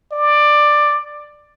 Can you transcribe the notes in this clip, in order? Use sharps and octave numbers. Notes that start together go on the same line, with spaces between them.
D5